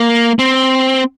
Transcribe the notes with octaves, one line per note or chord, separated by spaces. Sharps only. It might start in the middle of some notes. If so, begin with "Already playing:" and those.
Already playing: A#3
C4